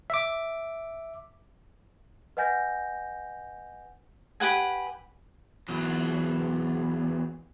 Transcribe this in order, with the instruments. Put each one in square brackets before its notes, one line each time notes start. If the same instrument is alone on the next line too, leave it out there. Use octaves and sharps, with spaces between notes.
[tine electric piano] E5 D6
[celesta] B4 D#5 F#5 G#5 G6 A#6
[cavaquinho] G4 B4 F#5 G#5
[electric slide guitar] E2 F#3